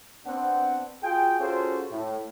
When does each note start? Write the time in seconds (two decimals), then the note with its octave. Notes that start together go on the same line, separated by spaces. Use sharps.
0.25 B3 C4 D4 F#5
1.02 F4 F#4 G#4 G5
1.40 C#4 F4 F#4 G#4 A4 C5
1.91 A2